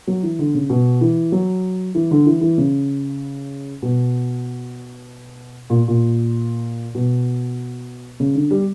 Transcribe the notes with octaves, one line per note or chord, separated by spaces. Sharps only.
F#3
E3
D3
C#3
B2
E3
F#3
E3
D3
E3
E3
C#3
B2
A#2
A#2
B2
C#3
D3
G3